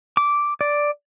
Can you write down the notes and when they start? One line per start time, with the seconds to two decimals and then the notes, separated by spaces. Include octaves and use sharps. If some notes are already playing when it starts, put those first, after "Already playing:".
0.17 D6
0.61 D5